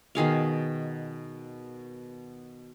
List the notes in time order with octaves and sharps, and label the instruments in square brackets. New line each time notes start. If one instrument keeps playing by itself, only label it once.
[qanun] B2 D#3 G#4 F5